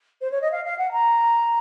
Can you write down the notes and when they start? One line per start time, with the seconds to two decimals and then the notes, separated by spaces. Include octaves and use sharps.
0.21 C5
0.32 C#5
0.42 D#5
0.52 F5
0.65 F5
0.78 F#5
0.92 A#5